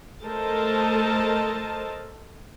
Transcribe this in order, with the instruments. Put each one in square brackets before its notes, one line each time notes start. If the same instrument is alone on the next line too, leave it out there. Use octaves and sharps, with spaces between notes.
[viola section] A3 A4 A#4 C5 D#5 A5